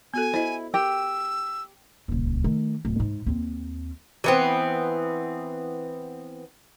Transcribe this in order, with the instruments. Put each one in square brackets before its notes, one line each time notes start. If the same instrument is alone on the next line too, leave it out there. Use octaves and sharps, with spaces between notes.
[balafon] B3 F#4 A4 [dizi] G#5
[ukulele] E4 [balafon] C5 D#5
[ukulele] G4 [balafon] A#4 [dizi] E6
[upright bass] D#1 C#2
D#3 A3
D1
G#2
D#2 C4
[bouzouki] E3 B3 C4